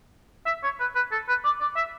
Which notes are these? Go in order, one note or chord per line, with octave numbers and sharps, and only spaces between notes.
E5
C#5
B4
B4
A4
B4
D5
D5
E5